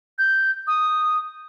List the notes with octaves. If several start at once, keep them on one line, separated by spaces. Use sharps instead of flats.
G6
D#6